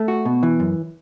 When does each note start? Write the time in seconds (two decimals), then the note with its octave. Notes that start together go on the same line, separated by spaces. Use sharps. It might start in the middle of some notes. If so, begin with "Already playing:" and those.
Already playing: A3
0.08 F#4
0.25 B2
0.43 E3
0.60 F#2